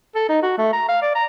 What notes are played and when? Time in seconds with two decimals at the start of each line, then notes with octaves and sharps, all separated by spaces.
0.15 A4
0.29 D#4
0.42 F#4
0.58 A3
0.73 A#5
0.88 F5
1.02 D5
1.15 A#5